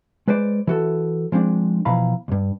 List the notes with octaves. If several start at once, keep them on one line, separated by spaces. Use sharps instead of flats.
G#3 B4 C5 D5
E3 F#4 A4
F3 G#3 C4 D4
B2 E3 F3 F5 A#5 B5
D2 G2